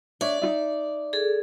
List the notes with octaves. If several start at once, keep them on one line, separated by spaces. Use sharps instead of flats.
D4 C#5 D5 E5
D#4 F4 E5
G#4 A4